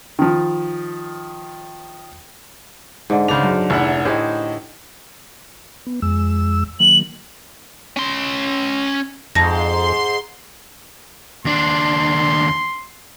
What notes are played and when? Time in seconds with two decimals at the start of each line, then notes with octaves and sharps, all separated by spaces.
0.19 D#3 F3
3.10 G#2 D3
3.28 C#3 D4 C5 D5 F7
3.43 F#2
3.70 F1 E4 F#5
4.05 A2 D#4 G4 G#4 C5
5.87 B3
6.02 F2 G#3 E6
6.80 D#3 F#3 A#3 F#7
7.96 C#4 C6
9.35 F2 G#2 A5 C6 A#6
11.45 D#2 D4 C6